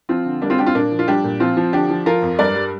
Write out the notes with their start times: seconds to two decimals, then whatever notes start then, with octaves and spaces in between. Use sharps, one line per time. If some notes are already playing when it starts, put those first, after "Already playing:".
0.09 F3 C4 F4
0.26 D3
0.42 G3 A#3 D4
0.50 C4 F4
0.58 G3 D4 G4
0.66 C4 F4
0.75 A#2 A#3 D4
0.91 F3
0.99 F4
1.08 G3 D4 G4
1.24 A#2
1.40 F3 C4 F4
1.57 F3
1.73 D3 D4 G4
1.89 F3
2.06 F3 F4 A#4
2.22 F2
2.39 G2 A#4 D5
2.55 G3